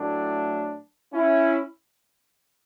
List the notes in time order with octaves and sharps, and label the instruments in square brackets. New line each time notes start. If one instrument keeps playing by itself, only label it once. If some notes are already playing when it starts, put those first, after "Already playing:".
Already playing: [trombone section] A2 F#3 A3 D4
C#4 E4